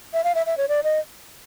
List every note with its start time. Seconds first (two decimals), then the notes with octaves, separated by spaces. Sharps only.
0.14 E5
0.24 F5
0.35 E5
0.46 E5
0.58 C#5
0.69 D5
0.84 D#5